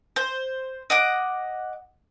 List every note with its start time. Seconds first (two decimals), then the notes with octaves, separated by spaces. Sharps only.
0.16 C5
0.90 D#5 F#5 D6